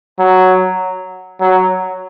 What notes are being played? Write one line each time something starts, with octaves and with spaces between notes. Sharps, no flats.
F#3
F#3